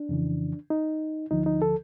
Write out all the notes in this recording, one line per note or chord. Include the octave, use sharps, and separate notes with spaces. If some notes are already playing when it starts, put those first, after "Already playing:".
Already playing: D4
F2 C#3 E3
D#4
D2 D3 F3 D#4
D#4
A4